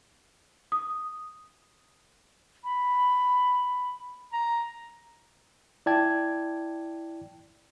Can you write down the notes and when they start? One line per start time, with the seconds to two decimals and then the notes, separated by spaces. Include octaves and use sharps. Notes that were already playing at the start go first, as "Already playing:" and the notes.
0.72 D#6
2.64 B5
4.33 A#5
5.86 E4 D5 G5 A5 G#6